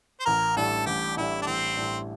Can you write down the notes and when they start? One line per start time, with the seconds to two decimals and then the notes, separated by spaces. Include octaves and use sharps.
0.20 C5
0.26 A1 A#4
0.56 A2 G3 D4 A4
0.86 A1 G4
1.17 A2 G3 D4 E4
1.42 D4
1.46 A1 C4
1.77 A2 G3 D4